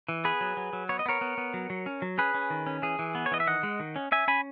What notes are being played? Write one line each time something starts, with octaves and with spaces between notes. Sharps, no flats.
E3
B3 G#4 B4
F#3
F#3
F#3
B3 C#5
D#5
B3 A#4 C#5
B3
B3
F#3
F#3
C#4
F#3
C#4 G#4 B4
C#4
D#3
C#4
E3 G#4
E3
B3
C#5
E3 D#5
E5
D#3 D#5 F#5
G#3
D#3
C#4
C#4 E5 G#5
C#4 G#5 B5